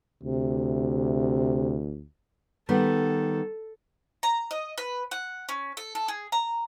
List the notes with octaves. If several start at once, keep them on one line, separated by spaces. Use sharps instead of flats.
D2 C3
D#3 G3 B3 A4
A#5
D#5
B4
F#5
C#4
A4
A4
G#4
A#5